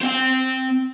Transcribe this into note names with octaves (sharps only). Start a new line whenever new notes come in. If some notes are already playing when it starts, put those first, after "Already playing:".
C4 G5